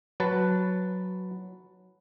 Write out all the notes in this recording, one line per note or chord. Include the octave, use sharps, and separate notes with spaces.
F#3 B4 A5